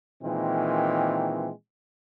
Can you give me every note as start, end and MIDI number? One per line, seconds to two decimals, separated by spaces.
0.23 1.50 46
0.23 1.50 51
0.23 1.50 52
0.23 1.50 56
0.23 1.50 60